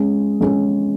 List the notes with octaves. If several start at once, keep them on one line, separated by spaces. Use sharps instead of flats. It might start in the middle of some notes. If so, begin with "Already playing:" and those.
Already playing: G#3 C#4 G#4
G#3 C#4 G#4